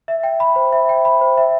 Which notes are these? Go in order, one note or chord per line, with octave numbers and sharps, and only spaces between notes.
E5
G5
B5
C5
E5
G5
B5
C5
E5